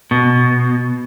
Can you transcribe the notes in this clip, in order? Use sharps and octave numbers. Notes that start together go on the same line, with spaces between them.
B2